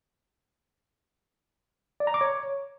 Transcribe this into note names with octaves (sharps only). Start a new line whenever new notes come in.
D5
A#5
D6
C#5